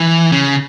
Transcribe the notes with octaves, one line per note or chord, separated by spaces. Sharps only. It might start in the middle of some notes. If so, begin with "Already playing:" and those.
Already playing: E3
C#3